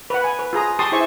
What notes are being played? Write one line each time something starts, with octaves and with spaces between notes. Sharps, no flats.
B4 F#5
G#5
B4
F4 G#4 A#5 D#6
G4 A5 C6 C#6 D#6
E4 G#4 C5 E5 G#5 C#6